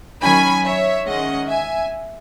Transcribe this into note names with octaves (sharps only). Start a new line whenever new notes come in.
D#3 F#3 C#4 G#5 B5
C#5 E5
D#3 G#3 C#4 D#5 F#5
E5 G#5